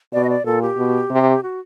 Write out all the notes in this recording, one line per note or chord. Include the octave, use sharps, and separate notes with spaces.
B2 D5
D#5
D5
A#2 A4
G4
B2
C3
F#4